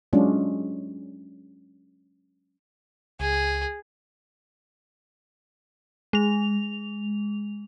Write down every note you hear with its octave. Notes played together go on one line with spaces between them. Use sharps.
F#3 G#3 C#4 D4 F4 G#4
C#2 G#4
G#3 F7